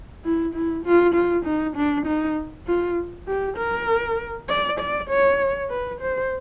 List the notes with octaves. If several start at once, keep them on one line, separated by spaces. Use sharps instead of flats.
E4
E4
F4
F4
D#4
D4
D#4
F4
G4
A#4
D5
D5
C#5
B4
C5